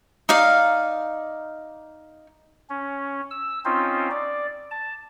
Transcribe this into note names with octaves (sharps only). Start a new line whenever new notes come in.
D#4 D5 F5
C#4
E6
C4 C#4 D#4 F4 C5
D5
A5